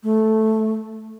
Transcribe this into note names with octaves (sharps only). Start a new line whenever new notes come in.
A3